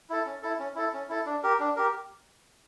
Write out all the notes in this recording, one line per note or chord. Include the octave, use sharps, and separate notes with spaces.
E4 A4
C#4
E4 A4
C#4
E4 A4
C#4
E4 A4
D4
G4 A#4
D4
G4 A#4